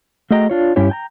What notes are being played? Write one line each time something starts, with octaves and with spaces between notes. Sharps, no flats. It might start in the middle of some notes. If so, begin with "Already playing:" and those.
A3 F#4 G#4 D#5 G5 A#5
D4 F4 C#5
G2 C#4 E4 G4 C#5
G5 G#5 A#5